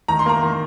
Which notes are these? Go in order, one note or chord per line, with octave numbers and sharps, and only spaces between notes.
D#3 A#5
C6
A#3 A#5
D#3